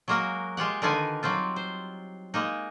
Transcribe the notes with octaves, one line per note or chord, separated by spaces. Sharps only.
F#3 G#3 A#3 F#4 A#4
G#3 F4 G4 F#5
D3 D#3 D#4 F4 B4 G#5
F#3 G3 C4 F4
C5
G#3 A#3 D#4